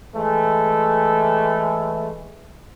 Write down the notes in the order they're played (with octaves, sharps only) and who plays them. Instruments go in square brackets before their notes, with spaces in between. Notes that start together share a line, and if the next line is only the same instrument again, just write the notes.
[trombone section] E3 G#3 A3